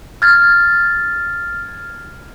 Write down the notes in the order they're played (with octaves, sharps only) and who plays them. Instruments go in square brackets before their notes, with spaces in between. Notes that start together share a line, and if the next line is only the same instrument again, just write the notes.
[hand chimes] F6 G#6 A6